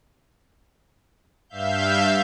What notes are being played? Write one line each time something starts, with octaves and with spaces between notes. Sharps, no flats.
G2 E5 F5 G6